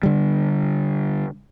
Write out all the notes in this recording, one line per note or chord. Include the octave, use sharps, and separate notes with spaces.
D3 G3